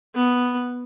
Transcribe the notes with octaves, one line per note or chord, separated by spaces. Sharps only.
B3